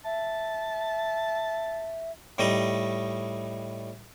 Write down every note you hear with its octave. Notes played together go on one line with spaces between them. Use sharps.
E5 A5
A2 G3 A3 D#4 D#5 D#6